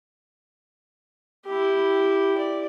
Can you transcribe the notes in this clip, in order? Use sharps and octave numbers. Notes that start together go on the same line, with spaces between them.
E4 G4
D5